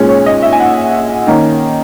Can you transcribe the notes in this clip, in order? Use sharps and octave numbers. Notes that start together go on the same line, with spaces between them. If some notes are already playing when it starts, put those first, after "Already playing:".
Already playing: A#2 G#3 C#4
C#5
D#5
E5
G#5
F#5
D#3 A#3 C#4